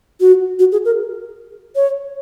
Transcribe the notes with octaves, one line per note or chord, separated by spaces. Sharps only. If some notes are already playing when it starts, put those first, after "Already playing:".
F#4
F#4
G#4
A#4
C#5